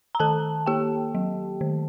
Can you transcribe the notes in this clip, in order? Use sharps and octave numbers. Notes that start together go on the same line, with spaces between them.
A#5
D#3 A4 A5
A#3 G4 G5
F#3
D#3